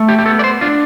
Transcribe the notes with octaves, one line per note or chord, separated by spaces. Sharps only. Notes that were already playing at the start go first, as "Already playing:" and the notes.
Already playing: A3
G4
G4
B3 A4
D5
C5
D4 F4